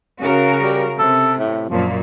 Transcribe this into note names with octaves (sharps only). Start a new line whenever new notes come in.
C#3 F#4 A#4
G3
C3 A4
A2
F#2 A#2 F3